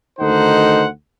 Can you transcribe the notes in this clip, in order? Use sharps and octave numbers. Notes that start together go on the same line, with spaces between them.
D2 D#3 D#4 A4 C5 F#5